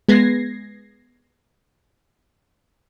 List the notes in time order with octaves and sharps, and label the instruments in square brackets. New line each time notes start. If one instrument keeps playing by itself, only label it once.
[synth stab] G#3 B3 G#6 A#6 C7